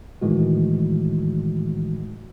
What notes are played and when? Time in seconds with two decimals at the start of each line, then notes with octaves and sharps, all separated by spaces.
0.22 A2 D#3 E3 G#3 F#4